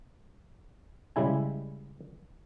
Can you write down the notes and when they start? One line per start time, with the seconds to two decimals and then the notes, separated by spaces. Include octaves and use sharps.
1.16 C#3 G3 G#3 E4 G#5